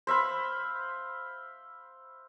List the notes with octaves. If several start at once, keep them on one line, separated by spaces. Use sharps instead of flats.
C5 E5 F5 B5